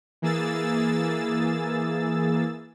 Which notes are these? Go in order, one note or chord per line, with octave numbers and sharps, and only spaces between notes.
E3 A#3 G#4 E6 A6